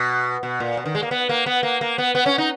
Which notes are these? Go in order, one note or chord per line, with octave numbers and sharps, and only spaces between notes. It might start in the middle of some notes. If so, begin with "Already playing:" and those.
Already playing: B2
B2
A#2
B2
D#3
G#3
A#3
B3
A#3
B3
A#3
A#3
B3
B3
C#4
D#4